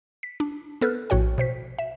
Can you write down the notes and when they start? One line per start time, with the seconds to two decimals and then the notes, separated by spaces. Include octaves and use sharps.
0.23 B6
0.40 D4
0.81 B3 A4 B4 F6 F#6
1.10 A#1 A2 F#4 C#5 G5
1.38 B2 C5 B6
1.79 E5